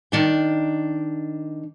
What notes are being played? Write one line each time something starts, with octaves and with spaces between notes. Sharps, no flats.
D#3 D4 G5